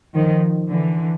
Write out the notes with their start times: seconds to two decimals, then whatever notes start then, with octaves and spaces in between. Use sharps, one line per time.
0.14 D#3 F3
0.69 D3 E3